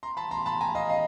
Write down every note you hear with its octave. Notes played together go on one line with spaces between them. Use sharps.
A#5 C6
A5 B5
A#5 C6
A5 B5
G#5 A#5
D#5 F5
D#5 F5